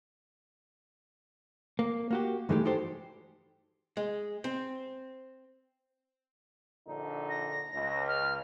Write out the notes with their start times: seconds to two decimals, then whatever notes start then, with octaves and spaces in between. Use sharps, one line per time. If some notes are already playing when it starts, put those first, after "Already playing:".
1.79 A#3
2.11 A#3 F#4 G4
2.49 G2 E3 G#3 A3 D#4 G4
2.65 D#4 F#4 G4 A4 C5
3.97 G#3
4.44 C4
6.86 A#1 D3 D#4
7.29 A#6
7.74 C#2
8.08 F6